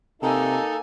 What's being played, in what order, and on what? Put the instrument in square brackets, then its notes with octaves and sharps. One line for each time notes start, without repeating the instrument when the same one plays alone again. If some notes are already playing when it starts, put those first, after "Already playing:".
[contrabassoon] C3 [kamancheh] A#3 G#5 [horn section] D#4 A4